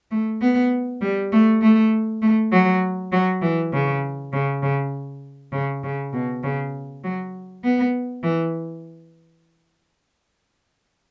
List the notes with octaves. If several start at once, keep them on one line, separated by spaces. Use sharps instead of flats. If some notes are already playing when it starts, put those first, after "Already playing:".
A3
B3
G3
A3
A3
A3
F#3
F#3
E3
C#3
C#3
C#3
C#3
C#3
B2
C#3
F#3
B3
E3